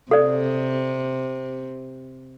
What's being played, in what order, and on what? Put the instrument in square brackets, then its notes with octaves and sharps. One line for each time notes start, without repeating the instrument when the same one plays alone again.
[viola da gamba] C3 [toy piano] A4 D5